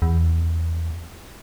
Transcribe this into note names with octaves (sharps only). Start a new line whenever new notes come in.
E2